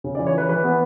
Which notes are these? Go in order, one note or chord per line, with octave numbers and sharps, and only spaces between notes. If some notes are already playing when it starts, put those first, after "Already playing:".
C#3
D5
E3
C#5
E3 B4
E3 B4
B3